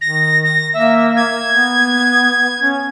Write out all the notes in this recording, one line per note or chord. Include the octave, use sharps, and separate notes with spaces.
D#3 A#6
A#6
A#3 E5
G#6
B3
C#4